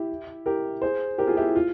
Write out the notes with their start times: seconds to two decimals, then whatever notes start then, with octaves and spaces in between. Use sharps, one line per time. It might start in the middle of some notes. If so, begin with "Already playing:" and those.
Already playing: E4 G4
0.46 G4 A#4
0.82 G#4 C5
1.18 G4 A#4
1.27 F4 G#4
1.37 E4 G4
1.56 F4